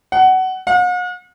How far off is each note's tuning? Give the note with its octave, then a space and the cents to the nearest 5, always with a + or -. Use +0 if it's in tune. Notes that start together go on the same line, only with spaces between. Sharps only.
F#5 +20
F#5 -45